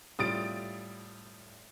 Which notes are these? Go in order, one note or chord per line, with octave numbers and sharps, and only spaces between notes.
A2 G3 F4 D#6 A6 D7